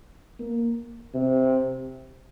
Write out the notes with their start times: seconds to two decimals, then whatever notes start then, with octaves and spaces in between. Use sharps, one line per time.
0.39 A#3
1.14 C3